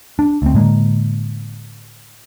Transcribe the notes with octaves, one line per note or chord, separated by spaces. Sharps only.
D4
D2 C4
A2 D3 G#3 A#3